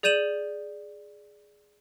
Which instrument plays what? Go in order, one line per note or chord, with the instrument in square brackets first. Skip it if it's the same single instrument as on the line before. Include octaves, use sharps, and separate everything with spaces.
[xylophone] G#4 D5 G6 D#7 E7 F#7